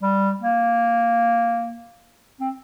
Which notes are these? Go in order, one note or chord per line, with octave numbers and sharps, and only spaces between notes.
G3
A#3
C4